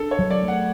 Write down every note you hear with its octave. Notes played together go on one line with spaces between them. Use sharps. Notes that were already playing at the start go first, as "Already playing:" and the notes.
Already playing: D4 A4
C#5
F#3
D5
A3
F#5